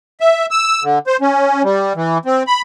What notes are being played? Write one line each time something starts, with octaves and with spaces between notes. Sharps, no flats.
E5
E6
D3
C5
C#4
G3
E3
C4
B5